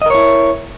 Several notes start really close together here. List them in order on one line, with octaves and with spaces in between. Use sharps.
D#5 A#4 C#5 E4